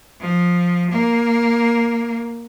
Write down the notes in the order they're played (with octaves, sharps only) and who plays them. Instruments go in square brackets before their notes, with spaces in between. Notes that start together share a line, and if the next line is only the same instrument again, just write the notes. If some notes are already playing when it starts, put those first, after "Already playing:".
[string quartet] F3
A#3